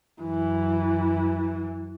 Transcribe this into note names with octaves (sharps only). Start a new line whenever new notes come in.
F#2 E3